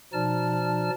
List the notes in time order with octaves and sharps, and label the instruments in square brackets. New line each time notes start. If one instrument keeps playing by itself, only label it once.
[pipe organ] B2 F3 D#4 D5 A5 F6